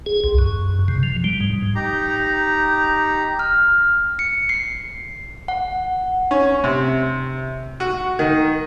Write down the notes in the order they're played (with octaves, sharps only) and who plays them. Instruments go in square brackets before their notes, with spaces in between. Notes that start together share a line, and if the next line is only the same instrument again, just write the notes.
[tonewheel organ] G#4
C2
F#2
C3
F3
G3
G#2
[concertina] D#4 G4 A#5
[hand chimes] F6
C#7
C7
F#5
[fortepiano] C#4
C3
F#4
D#3